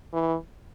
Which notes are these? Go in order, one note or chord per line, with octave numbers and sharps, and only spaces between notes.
E3